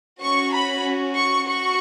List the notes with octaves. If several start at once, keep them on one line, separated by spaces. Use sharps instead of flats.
C#4 F#4 C#6
B5
C#6
F#4 C#6